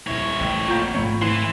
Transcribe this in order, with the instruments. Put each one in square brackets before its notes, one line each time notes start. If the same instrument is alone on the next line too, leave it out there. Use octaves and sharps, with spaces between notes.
[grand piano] D#1 E4 [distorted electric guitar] F2 C#5
[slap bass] A1 [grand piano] G5
[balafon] A#3 F4 [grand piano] F5 A#5 D7
[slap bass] G#2 A3 C4 [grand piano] C#5 B5
[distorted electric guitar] E3 [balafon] E4